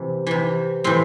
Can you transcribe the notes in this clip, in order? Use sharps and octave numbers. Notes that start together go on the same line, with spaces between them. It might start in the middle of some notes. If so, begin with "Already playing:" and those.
Already playing: C3 E3
C3 E3
A2 E3 C4